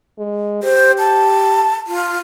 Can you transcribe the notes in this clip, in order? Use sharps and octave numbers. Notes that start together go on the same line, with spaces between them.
G#3
G4 C5
A5
F4